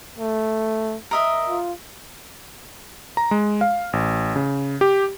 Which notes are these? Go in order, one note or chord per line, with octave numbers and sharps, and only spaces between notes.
A3
A#4 D#5 E5
F4
A#5
G#3
F5
A1
C#3
G4